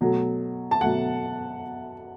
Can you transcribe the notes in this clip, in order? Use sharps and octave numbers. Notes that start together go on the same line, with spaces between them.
B2 F#3 A3
A5
B2 F#3 A3 F#5